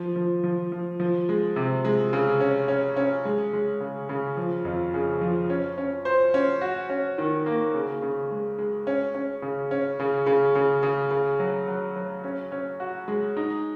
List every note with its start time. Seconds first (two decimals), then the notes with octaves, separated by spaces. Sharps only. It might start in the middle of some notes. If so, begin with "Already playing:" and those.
Already playing: F3
0.16 F3
0.44 F3
0.72 F3
1.00 F3
1.29 G#3
1.56 C3
1.85 G#3
2.13 C#3
2.40 C#4
2.68 C#4
2.97 C#4
3.25 G#3
3.53 G#3
3.80 C#3
4.09 C#3
4.37 F3
4.65 F2
4.94 C#3
5.21 F3
5.50 C#4
5.78 C#4
6.05 C5
6.34 C#4
6.61 F#4
6.90 C#4
7.18 D#3
7.46 A#3
7.74 C#3
8.02 C#3
8.31 G#3
8.59 G#3
8.87 C#4
9.15 C#4
9.42 C#3
9.71 C#4
10.00 C#3
10.26 C#3
10.55 C#3
10.83 C#3
11.11 C#3
11.39 F#3
11.68 F#3
11.96 F#3
12.24 C#4
12.52 C#4
12.80 F#4
13.08 G#3
13.37 D#4